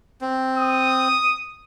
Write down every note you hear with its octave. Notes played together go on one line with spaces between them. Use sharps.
C4
D#6